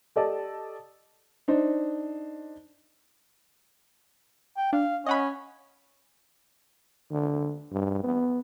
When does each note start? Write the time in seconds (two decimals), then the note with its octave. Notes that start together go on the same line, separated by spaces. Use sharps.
0.16 G4 A4 D5 D#5 A5
1.48 D4 D#4 C5
4.57 G5
4.73 D4 F5
5.06 C#4 D#5 F#5 B5
7.12 D3
7.72 G2
8.03 B3